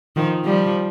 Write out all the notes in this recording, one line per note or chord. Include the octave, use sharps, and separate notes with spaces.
D#3 F3
F3 G3